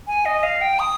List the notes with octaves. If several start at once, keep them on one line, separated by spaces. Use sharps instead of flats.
G#5
D#5
F5
G5
D#6